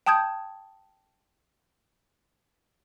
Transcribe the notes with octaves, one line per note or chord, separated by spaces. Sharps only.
G5 A5 D#6 G6 G#6